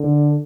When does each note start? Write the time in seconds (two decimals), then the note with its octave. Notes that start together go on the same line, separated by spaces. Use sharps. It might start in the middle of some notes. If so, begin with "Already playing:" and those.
Already playing: D3